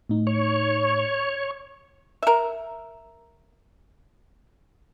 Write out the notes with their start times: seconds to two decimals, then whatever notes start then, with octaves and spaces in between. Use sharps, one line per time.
0.09 A2 D#4
0.27 C#5
2.23 A#4 E5